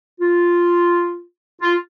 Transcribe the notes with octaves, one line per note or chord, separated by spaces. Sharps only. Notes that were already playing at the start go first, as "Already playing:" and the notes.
F4
F4